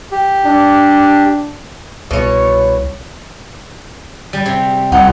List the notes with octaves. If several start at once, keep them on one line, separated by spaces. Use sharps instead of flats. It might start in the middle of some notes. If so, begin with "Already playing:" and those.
G4
D4
C2 B2 C#5
G3
C3
C2 D#4 F#5